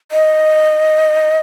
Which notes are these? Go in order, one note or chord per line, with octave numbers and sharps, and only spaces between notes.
D#5